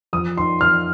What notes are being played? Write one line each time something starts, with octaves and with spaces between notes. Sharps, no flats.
F2 D#6
D#3 C6
F2 F6